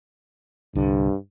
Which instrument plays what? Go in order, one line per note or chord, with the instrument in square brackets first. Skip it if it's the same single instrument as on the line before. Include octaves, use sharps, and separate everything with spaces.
[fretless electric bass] C2 D3 [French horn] G2